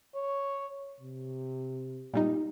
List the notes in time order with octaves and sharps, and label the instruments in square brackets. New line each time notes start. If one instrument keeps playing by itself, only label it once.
[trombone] C#5
C3
[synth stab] A#2 G3 D#4